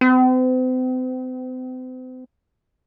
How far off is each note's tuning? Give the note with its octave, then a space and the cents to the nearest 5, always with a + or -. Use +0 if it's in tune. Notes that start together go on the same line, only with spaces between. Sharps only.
C4 -40